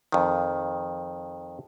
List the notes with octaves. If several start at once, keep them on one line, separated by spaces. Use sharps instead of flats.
F2 D#3